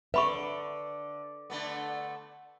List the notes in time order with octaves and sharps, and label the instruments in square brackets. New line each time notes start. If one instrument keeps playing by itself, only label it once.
[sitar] D3 [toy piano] B4 B5 C#6 [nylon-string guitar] E5
[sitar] D3 A3 B3